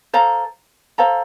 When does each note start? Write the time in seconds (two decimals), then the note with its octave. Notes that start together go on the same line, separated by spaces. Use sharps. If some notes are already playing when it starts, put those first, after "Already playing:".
0.13 A4 C5 F5 A#5
0.98 A4 C5 F5 A#5